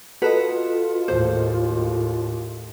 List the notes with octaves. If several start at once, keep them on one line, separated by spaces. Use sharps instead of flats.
F4 F#4 A4 B4 D#5
D#2 A2 C5